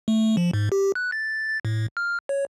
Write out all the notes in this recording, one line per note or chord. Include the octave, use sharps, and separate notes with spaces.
A3
F3
G#2
G4
F#6
A6
A6
A2
F6
C#5